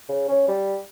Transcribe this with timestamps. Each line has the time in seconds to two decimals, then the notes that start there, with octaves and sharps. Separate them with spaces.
0.09 C#3
0.28 C#4
0.48 G3